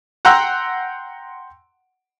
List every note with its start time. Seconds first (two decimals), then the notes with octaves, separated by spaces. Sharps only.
0.25 F#5 G5 A#5 C6 E6 F#6